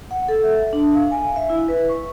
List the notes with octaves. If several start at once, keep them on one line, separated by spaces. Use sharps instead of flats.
F#5
A4
E5
D4
F5
G#5
E5
E4
B4
C#6